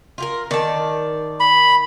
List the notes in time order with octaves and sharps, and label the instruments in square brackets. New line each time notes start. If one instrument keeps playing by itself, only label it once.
[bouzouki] F4 G4 A#4
[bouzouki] D#3 [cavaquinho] D5 A5
[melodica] B5